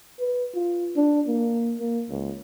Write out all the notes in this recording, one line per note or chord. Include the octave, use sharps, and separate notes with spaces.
B4
F4
D4
A#3
A#3
C#2